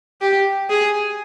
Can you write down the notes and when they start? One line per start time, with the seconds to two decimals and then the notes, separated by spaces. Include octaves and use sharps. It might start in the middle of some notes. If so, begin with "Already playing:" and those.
0.21 G4
0.70 G#4